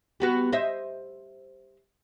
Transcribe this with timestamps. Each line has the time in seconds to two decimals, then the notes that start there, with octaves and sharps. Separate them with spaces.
0.20 G3 B3 F#4
0.52 C5 D#5 E5